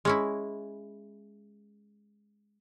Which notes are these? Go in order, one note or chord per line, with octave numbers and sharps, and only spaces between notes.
G#3 C#4 E4